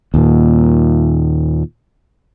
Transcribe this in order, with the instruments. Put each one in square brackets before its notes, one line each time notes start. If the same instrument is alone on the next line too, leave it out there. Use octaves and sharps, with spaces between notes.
[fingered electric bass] D#2 A#2